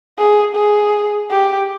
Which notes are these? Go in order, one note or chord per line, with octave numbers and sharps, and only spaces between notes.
G#4
G#4
G4